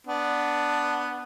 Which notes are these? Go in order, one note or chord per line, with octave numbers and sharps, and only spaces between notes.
B3 D4